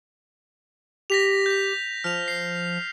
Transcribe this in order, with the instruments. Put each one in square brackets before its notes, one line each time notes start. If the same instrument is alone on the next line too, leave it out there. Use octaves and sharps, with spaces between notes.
[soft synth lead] G4 [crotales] A#6 B6 F7
[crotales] G6 B6
[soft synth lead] F3 [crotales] F6 F7
[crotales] C7